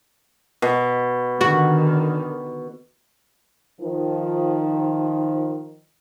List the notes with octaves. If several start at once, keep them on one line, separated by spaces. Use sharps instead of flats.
B2
D3 D#3 F#4
D#3 F3